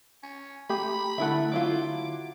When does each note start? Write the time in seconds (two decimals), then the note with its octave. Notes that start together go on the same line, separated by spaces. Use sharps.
0.23 C#4
0.70 A3 G4 G#4 B5
1.18 D3 A3 E4 E5 F#5
1.52 F#3 E4 F4 D6